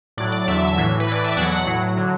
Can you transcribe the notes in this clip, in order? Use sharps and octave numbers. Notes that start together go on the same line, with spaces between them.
A2 F#3 D5
D5
E2 D3 F#3 E5
A2 E3
B4
A2 E3 D5
E5
E2 B2 F#3 F#5
A2 F#3
D3 F#3